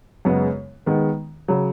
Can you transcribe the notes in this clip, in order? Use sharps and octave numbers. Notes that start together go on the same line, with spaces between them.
F#2 C#3 G#3 B3
D#3 G#3 B3
C#3 F#3